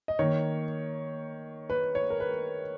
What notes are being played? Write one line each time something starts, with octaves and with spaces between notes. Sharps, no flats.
D#5
D#3 A#3 C#5
B4
C#5
A#4
B4